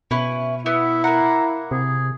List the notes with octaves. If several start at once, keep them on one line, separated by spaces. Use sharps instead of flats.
B2 C#4 E4 B4
B3 E4 E5
A#3 F#5 A#5
C3 G#4